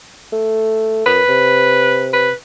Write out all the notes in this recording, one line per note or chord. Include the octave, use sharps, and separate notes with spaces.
A3
F#2 B4
C3
B4